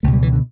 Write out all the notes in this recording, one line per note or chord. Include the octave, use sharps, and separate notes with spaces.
C#2 B2 A3
G3
E3
D3